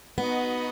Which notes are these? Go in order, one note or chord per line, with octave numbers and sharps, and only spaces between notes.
B3 D#4 F#4 B4 D#5